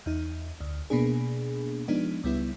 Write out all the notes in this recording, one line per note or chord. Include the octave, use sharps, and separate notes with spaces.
E2 D#4
D2
B2 A#3 B3 D4 G#4
F3 G#3 B3 D4 D#4
C#2 G3 B3 E4